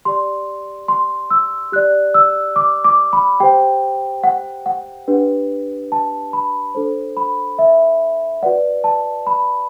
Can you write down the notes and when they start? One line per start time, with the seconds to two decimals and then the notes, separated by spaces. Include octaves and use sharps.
0.05 G4 D5 C6
0.88 C6
1.31 E6
1.72 G4 D5 F#6
2.14 E6
2.56 D6
2.84 D6
3.13 B5
3.40 G4 C5 G5
4.24 F#5
4.66 F#5
5.08 D4 G4 B4
5.92 A5
6.33 B5
6.75 D4 A4 C5
7.17 B5
7.59 E5
8.43 F#4 B4 D5 F#5
8.84 A5
9.27 B5